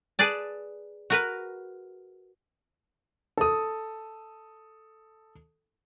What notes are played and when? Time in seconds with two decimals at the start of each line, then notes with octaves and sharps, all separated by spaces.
0.19 G#4 B4 D5 A5
1.10 F#4 A#4 B4
3.37 A4 D#6